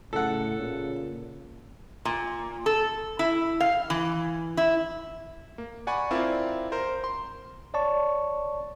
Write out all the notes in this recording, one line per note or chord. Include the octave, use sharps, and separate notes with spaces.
A2 C#3 A4 F#5
A#2 C#3
A#2
A4
E4
F5
E3
E4
A#3
D5 F#5 G#5 B5 C#6
C4 E4 F4 A#4 D5
A#4 C5
C6
C#5 D5 A5 C#6